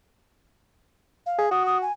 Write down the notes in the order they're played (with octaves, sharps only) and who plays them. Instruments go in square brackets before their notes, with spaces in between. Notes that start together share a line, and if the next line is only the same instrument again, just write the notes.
[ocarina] F5
[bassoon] G#4
[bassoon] F#4 [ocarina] D#6
[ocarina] D#6
G#5